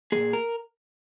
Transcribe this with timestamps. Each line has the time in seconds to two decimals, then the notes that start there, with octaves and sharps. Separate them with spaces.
0.12 A#2 F3 A#3 G#4
0.33 A#4